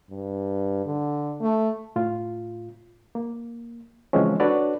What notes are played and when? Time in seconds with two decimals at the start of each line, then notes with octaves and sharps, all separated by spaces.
0.10 G2
0.86 D3
1.41 A3
1.96 A2 F4
3.15 A#3
4.13 C#3 E3 F3 G#3 C4 C#4
4.40 D4 F#4 A4 B4 C#5 D5